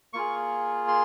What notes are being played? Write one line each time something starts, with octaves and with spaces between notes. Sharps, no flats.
A#3 F4 G#4 C#6
C6